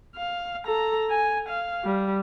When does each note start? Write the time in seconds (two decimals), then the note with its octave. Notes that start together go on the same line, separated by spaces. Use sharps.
0.16 F5
0.66 A4 A#5
1.10 G#5
1.49 F5
1.84 G3